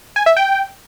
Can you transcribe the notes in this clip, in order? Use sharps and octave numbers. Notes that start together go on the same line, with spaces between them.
G#5
E5
G5